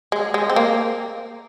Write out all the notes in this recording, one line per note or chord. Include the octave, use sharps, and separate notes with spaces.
G#3
G#3
C4
A#3